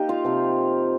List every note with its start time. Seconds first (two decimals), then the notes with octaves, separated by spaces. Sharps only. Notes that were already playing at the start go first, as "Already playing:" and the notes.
Already playing: A#3 D#4 G4
0.09 F4 F5
0.24 C3 F3 C4